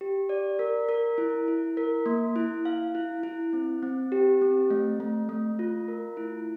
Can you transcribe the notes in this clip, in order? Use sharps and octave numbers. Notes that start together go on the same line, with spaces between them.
G4
D5
A#4
A#4
E4
E4
A#4
A#3
E4
F5
E4
E4
C4
C4
G4
C4
A3
A3
A3
F4
A#4
E4